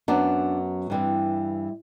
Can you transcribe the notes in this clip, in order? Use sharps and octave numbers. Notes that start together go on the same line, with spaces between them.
F#2 F#3 B3 D4
G2 E3 G3 C4